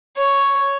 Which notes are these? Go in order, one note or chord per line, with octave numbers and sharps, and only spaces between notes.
C#5